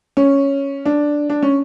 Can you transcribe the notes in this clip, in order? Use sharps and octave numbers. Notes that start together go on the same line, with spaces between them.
C#4
D4
D4
C#4